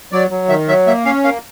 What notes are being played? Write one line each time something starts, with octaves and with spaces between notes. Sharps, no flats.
F#3 D5
F#3
D#3 E5
F#3 E5
A#3 E5
C#4 F5
A#3 F5